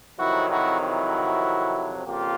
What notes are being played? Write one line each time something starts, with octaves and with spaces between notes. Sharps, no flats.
F2 C3 D#3 F#3 E4 F#4
E4 F#4
E4 F#4
F2 C#3 A#3 F4 G4